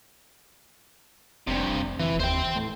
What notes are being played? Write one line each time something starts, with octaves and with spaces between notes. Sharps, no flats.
F1 G2 C3
F1
E3
D#2 C5 G5
A2